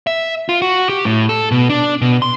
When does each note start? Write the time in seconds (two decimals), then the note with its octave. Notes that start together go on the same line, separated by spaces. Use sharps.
0.07 E5
0.49 F4
0.62 F#4
0.89 G4
1.05 A2
1.29 A4
1.51 B2
1.70 D4
2.02 B2
2.22 C6